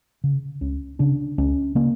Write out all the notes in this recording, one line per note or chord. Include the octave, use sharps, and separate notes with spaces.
C#3
C#2 C#4
C#3 D4
C#2 C#4
C#3 A#3